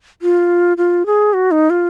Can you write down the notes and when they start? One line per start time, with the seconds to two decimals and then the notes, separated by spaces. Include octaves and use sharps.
0.22 F4
0.77 F4
1.06 G#4
1.33 F#4
1.51 D#4
1.70 F4